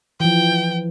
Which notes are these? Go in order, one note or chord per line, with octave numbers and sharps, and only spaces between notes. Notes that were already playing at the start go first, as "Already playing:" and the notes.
E3 F3 G5